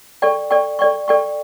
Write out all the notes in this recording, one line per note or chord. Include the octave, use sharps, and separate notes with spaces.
A4 D5 G5 C#6
A4 D5 G5 C#6
A4 D5 G5 C#6
A4 D5 G5 C#6